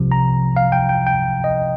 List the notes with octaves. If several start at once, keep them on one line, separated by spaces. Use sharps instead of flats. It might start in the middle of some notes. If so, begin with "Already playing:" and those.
Already playing: C2 C3 F3
A#5
F5
G5
G5
G5
D#5